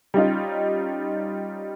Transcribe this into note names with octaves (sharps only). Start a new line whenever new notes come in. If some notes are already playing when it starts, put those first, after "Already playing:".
G3 C#4 D#4 F4